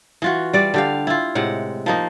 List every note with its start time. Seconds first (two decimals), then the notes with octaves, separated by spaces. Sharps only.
0.22 E3 F4 F#4
0.53 G3 D5
0.74 D3 G4 F5
1.07 E4 F4
1.35 A2 C3 G#3 F#5
1.86 F3 A#3 D#4